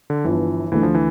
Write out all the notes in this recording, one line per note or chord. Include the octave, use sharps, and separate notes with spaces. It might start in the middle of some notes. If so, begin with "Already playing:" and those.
D3
G1 G2 E3 F3
D2 D3 E3 A3
F3
E3